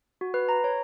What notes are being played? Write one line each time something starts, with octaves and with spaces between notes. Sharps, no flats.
F#4
B4
A#5
C#5